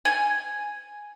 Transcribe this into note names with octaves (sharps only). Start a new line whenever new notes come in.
G#5